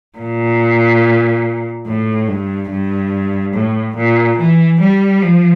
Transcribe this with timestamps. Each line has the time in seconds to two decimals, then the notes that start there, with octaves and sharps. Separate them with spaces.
0.18 A#2
1.87 A2
2.28 G2
2.71 G2
3.54 A2
3.96 A#2
4.39 E3
4.81 G3
5.22 F3